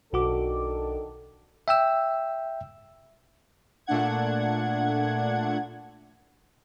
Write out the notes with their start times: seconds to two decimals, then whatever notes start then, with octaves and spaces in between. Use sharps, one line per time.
0.13 B1 D#3 D4 F#4 A4 D6
1.68 E5 G5 E6
3.86 A#2 A3 D4 F#5 G#6